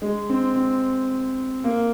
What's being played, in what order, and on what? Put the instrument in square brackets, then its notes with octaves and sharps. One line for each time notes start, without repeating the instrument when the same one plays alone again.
[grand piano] G#3
C4
C4
A#3